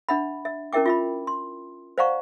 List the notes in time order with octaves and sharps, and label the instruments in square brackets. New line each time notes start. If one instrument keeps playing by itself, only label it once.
[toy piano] D4 E5 F#5 B5
E5
C#4 E4 A#4 E5 G5 D6
F4 E5 B5
C6
C5 D5 F5 F#5 A#5 C#6